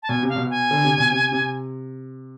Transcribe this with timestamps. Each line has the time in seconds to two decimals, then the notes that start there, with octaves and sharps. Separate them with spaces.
0.03 A5
0.09 B2 G#5
0.23 C3
0.29 F5
0.36 B2
0.50 G#5
0.71 D3
0.84 C3
0.98 B2
1.11 C3
1.32 C3